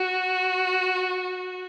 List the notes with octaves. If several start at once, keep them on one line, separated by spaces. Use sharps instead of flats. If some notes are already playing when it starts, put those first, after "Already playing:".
Already playing: F#4